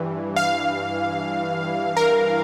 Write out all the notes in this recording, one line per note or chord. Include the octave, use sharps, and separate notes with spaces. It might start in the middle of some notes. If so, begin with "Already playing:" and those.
Already playing: G2 E3
F5
A#4